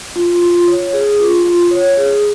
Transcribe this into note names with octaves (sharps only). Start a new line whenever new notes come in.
F4
F4
C#5
G#4
F4
F4
C#5
G#4